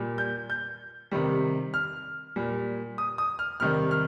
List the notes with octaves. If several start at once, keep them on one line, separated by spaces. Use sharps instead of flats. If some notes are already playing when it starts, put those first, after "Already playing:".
Already playing: A#2 G3
G6
G6
C3 D#3 G3
F6
A#2 G3
D#6
D#6
F6
C3 D#3 G3 F6
F6